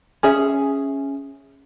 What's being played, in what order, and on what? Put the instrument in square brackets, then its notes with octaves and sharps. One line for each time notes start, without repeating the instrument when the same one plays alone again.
[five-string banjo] C#4 G#4 E5